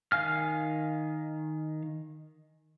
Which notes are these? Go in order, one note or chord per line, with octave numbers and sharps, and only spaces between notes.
D#3 F5 G#5 F6